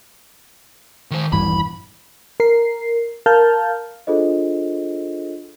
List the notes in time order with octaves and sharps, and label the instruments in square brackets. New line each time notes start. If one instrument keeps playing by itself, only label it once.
[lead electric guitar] D#3 C5
[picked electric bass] D#1 G2 E3 [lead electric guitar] B5
[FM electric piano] A#4 C7
A#4 F5 A5 F6 G6
[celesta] D4 F4 G#4 A4 C5 D#5